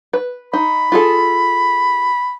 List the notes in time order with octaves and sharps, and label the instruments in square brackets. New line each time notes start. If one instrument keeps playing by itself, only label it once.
[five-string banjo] B4
[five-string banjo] D#4 [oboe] B5
[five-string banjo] F4 G#4 A4